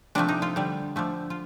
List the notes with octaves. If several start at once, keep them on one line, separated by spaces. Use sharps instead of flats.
C3 F3 A3 D4
D#4
F4
D3 G3
D3 F3 A3
F4